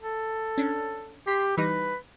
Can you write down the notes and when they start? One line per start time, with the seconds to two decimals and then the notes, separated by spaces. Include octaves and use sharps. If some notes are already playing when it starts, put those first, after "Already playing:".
0.01 A4
0.58 C#4 D4
1.27 G4 C6 B6
1.57 E3 G3 D#4 B4